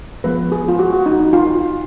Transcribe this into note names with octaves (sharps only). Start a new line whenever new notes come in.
F3 G#3 B3 B4
G#4
F4
F#4
F#4
D#4
D#4
F4